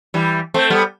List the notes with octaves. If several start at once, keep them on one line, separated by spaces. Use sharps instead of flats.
E3 G3
A3 C4
G3 B3